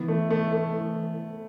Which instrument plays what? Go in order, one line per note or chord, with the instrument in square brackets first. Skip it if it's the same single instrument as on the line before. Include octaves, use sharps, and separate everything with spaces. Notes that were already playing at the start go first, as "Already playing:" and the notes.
Already playing: [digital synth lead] E3 [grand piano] B3
[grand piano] A3
A3
A3